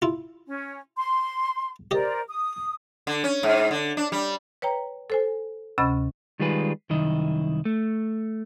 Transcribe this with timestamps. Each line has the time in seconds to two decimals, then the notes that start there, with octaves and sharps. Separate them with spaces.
0.02 E4 F4
0.48 C#4
0.97 C6
1.91 G4 A#4 C5 D5 D#5
2.28 D#6
3.07 D3
3.24 C#4
3.43 G#2
3.71 D3
3.97 D4
4.12 G3
4.62 B4 C#5 G5 A#5
5.10 A4 C5 G#5
5.78 D2 C3 C#4 D#5 B5 A6
6.40 D#3 G3 G#3 F4 G#4 B4
6.90 C2 F#2 D#3 E4 D#5
7.65 A3